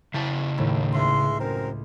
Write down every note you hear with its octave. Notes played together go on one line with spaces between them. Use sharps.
C#3 E4 A5 G6
D#2 A2 A3
C#2 G#3 E5 C6
F#2 C4 A#4